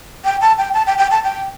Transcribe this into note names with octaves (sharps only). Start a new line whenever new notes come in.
G5
A5
G5
A5
G5
G5
A5
G5